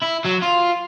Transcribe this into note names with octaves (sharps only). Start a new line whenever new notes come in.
E4
F#3
F4